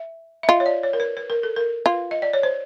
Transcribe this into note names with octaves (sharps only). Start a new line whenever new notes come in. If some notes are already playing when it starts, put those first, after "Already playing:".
Already playing: E5
E5
F4 D#5
C#5
D5
C#5
A#4
B4
B4
A#4
A4
A#4
F4 B4
D#5
D5
C#5
C5